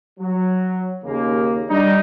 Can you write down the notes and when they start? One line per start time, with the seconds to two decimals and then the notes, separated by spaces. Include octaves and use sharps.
0.20 F#3
1.04 D#2 C#3 A#3
1.69 G3 D4 D#4